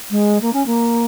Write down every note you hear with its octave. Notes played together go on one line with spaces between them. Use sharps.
G#3
A#3
C#4
A#3